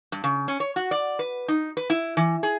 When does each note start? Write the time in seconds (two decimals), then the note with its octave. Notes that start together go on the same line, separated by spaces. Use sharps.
0.12 G2
0.24 C#3
0.48 C#4
0.60 C#5
0.76 F#4
0.91 D5
1.19 B4
1.48 D#4
1.77 B4
1.90 E4
2.17 E3
2.43 G#4